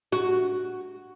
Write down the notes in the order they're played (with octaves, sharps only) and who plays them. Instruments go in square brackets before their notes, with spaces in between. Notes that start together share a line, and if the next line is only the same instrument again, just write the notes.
[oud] F#4